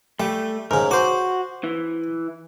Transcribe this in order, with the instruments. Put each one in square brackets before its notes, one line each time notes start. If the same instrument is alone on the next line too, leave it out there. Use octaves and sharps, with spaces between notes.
[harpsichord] G3 [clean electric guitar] A3
[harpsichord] G#2 C#3 [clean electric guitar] A#4
[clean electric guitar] F#4 [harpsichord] C5 D6
[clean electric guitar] E3